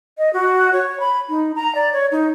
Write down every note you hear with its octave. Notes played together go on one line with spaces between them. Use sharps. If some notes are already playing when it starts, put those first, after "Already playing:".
D#5
F#4
C#5
B5
D#4
A#5
D5
C#5
D#4